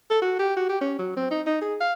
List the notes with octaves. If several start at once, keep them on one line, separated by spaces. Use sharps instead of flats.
A4
F#4
G4
F#4
G4
C#4
F#3
C4
D#4
D#4
G#4
F5